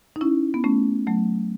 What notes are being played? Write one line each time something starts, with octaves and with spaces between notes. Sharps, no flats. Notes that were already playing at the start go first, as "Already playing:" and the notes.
D#4
C#4 E4
B3
A3 C#4
F#3 A3